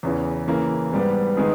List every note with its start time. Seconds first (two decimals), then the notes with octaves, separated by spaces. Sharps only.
0.03 E2 C#3 E3
0.48 C#3 E3 A#3
0.92 G#2 G3 B3
1.37 D#3 G#3 B3 D#4 G#4